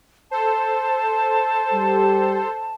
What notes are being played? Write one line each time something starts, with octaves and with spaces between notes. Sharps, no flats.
A4 C5 A5
G3 G4